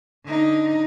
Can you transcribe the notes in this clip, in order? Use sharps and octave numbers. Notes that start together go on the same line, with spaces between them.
D3 D#4